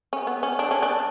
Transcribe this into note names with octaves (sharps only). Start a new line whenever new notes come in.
C#4
B3
C#4
D4
C#4
D4